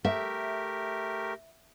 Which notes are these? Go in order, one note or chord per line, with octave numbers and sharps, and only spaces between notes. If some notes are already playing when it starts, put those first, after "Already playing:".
A3 G4 A#4 E5